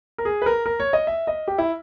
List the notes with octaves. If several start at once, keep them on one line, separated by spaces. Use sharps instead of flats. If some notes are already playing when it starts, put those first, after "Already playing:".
A#4
G#4
B4
A#4
A#4
C#5
D#5
E5
D#5
G4
E4